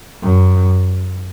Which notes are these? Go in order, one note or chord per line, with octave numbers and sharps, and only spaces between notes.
F#2